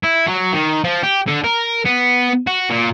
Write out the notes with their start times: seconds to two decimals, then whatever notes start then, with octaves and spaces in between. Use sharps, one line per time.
0.03 E4
0.27 F#3
0.53 D#3
0.84 F3
1.03 G4
1.27 D3
1.44 A#4
1.85 B3
2.47 F#4
2.70 A#2